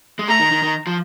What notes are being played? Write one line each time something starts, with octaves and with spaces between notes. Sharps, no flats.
G#3
A3 A#5
D#3
D#3
D#3
F3